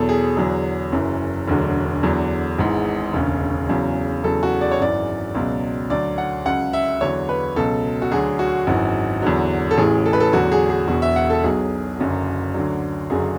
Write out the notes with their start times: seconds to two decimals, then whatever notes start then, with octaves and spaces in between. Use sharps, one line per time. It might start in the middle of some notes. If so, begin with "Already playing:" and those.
Already playing: E2 B2 F#3 A4
0.09 G#4
0.37 E2 D3 F#3
0.92 F#1 F#2 E3
1.48 E1 D2 D3 F#3
2.03 E2 D3 F#3
2.59 G#1 G#2 E3
3.13 E1 D2 C#3
3.69 E2 C#3 F#3
4.24 E2 C#3 F#3 A4
4.43 F#4
4.61 D5
4.72 C#5
4.80 G#1 F#2 E3 D5
5.35 C#2 B2 F#3
5.90 D2 D3 F#3 D5
6.18 F#5
6.46 C#2 C#3 F#3 F#5
6.73 E5
7.01 E2 D3 F#3 C#5
7.29 B4
7.56 C#2 B2 F#3 A4
8.02 F#4
8.11 D2 D3 F#3 G#4
8.39 F#4
8.67 G#1 F#2 E3
9.22 E2 D3 F#3
9.71 A4
9.78 A1 A2 E3 G#4
10.06 A4
10.13 B4
10.20 A4
10.33 E2 D3 F#3 F#4
10.52 G#4
10.70 G#4
10.88 E1 E2 B2 F#4
11.02 E5
11.16 F#5
11.30 A4
11.44 B1 B2 F#3 G#4
11.99 F#1 F#2 D3 F#3
12.54 D2 D3 F#3
13.10 F#1 F#2 D3 F#3 G#4